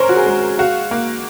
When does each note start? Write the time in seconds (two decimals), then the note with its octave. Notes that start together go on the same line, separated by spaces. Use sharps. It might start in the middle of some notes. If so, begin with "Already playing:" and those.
Already playing: C#4 A#4 C5 C#5
0.09 F#4
0.16 G#4
0.26 G#3
0.59 F#4 F5
0.91 A#3